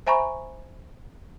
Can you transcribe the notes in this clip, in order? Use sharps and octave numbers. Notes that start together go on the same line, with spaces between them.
C5 E5 G#5 A#5 B5 C#6